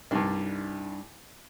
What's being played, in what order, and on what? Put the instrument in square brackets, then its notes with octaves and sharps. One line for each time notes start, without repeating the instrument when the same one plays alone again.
[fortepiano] C2 G2 [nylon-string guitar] G3 D4 D#4